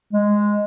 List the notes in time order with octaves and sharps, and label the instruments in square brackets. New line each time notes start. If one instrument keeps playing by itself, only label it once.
[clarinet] G#3